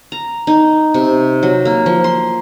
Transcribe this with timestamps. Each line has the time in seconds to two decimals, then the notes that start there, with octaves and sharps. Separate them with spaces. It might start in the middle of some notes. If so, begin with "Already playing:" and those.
0.12 A#5
0.47 D#4
0.94 C3
1.43 F#3
1.65 A#3
1.86 F3
2.04 C6